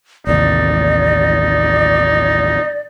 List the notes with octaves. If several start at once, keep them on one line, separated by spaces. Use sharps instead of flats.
A1 D#2 C3 D#4 D5